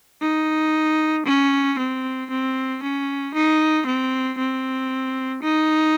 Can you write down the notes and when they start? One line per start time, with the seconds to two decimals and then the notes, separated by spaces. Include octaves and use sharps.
0.22 D#4
1.26 C#4
1.78 C4
2.30 C4
2.83 C#4
3.34 D#4
3.86 C4
4.38 C4
5.42 D#4